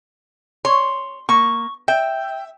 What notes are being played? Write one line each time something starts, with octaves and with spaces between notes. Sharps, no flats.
C#5 C6
A#3 C#6
E5 G5